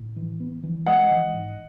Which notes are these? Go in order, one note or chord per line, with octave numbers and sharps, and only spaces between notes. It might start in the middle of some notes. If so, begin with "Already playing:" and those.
Already playing: A2
E3
B3
E3
G#3 D#5 F#5
E3
G#2